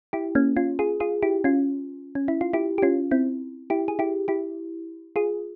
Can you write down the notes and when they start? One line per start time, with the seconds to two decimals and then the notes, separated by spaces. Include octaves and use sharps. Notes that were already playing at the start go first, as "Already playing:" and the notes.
0.13 E4 G4
0.35 A#3 C#4
0.56 C#4 F4
0.79 F4 G#4
1.00 F4 G#4
1.23 E4 G4
1.44 C#4 F4
2.15 C#4
2.28 E4
2.41 F4
2.53 E4 G4
2.78 G4
2.82 C#4 F4
3.11 C4 E4
3.70 E4 G4
3.88 G#4
3.99 E4 G4
4.28 E4 G4
5.16 F4 G#4